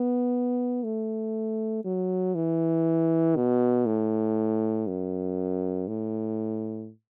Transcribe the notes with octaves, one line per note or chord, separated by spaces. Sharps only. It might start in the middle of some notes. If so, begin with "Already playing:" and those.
Already playing: B3
A3
F#3
E3
B2
A2
F#2
A2